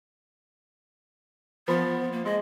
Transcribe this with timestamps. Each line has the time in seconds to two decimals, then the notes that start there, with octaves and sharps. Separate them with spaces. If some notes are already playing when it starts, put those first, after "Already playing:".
1.68 F3 B3 B5
2.12 A#3
2.25 G#3 D#5